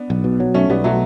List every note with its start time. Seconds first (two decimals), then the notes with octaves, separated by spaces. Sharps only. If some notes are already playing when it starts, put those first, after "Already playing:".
Already playing: B3 D4
0.10 B1
0.24 B2
0.40 F#3
0.54 B1 A3 C#4
0.69 B1 G3 B3
0.84 B2 F#3 A3